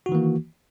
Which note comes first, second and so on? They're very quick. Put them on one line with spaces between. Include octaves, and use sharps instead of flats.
F#4 D#3 E3 A#3